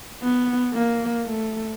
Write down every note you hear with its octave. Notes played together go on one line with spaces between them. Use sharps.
B3
A#3
A3